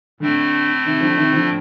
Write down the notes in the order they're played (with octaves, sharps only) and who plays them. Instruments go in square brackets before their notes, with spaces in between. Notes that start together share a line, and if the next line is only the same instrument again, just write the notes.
[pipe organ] A2 A3 C4 [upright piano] D3
[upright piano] C3 D#3
D3 F3
C3 D#3
D3 F3